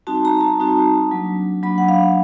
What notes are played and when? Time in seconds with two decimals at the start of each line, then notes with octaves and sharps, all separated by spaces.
0.07 G3 C4 D#4 F#4 A5
0.25 A#5
0.41 A5
0.60 G3 C4 D#4 F#4
1.11 F#3 A#3 D4
1.63 F#3 A#3 D4 B5
1.78 F#5
1.88 F5